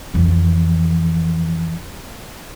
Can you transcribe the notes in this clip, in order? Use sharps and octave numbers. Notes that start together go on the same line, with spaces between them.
F2 E3